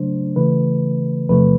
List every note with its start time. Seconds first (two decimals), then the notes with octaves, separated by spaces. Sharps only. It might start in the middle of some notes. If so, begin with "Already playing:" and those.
Already playing: C#3 F#3 A3 D4 C5
0.36 C#3 E3 A3 B4
1.29 E2 C3 F3 A3 B4